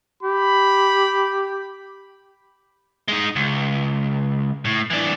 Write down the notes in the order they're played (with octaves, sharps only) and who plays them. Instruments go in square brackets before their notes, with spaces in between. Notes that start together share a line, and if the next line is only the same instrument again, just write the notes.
[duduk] G4 [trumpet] B5
[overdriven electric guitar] G#3 D#4
C#2
A2
E3 D4